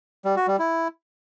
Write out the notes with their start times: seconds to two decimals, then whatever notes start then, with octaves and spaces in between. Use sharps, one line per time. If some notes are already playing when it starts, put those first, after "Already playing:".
0.25 G3
0.36 F#4
0.48 G3
0.59 E4